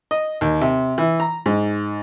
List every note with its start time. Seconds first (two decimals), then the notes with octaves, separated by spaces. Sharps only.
0.11 D#5
0.41 D#2
0.61 C3
0.98 E3
1.20 A#5
1.46 G#2